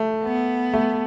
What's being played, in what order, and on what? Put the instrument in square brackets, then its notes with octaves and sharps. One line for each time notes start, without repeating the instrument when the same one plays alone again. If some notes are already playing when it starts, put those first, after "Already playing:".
Already playing: [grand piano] A3
[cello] B3
[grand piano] A3